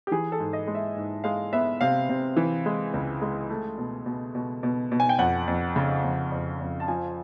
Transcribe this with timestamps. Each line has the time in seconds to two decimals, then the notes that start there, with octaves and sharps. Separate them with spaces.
0.07 G4
0.11 E3 G#4
0.32 A4
0.39 G#2
0.53 D#5
0.67 G#3
0.75 E5
0.96 G#2
1.24 G#3 F5
1.53 B3 E5
1.81 C3 F5
2.09 C3
2.37 E3
2.66 G#3
2.94 C#2
3.22 G#3
3.50 A3
3.78 B2
4.06 B2
4.35 B2
4.63 B2
4.92 B2
5.00 G#5
5.09 G5
5.19 F2 F#5
5.48 F2
5.76 C#3
6.04 F2
6.32 F2
6.61 F2
6.80 A5
6.88 F3 G#5